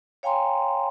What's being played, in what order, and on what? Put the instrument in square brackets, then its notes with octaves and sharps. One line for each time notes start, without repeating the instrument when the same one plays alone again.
[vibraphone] C#5 F5 G5 G#5 A#5 C6